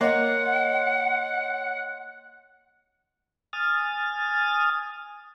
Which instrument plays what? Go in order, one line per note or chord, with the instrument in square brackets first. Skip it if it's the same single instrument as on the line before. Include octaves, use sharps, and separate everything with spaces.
[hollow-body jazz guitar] A#3 [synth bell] C#5 D#5 C6 [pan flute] F#5 [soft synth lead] F#6
[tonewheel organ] G#5 D#6 F6 A6